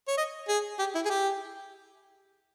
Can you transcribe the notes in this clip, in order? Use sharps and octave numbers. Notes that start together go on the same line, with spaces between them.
C#5
D#5
G#4
G4
E4
G#4
G4